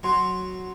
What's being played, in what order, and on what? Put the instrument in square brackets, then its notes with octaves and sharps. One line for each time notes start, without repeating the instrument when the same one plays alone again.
[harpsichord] F#3 [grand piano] C6